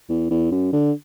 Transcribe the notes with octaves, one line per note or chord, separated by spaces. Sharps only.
E2
E2
F#2
D3